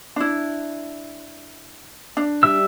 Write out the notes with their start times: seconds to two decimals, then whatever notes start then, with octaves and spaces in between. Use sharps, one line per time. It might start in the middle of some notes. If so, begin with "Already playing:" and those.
0.16 D4 E4
2.17 D4
2.43 G3 E5 E6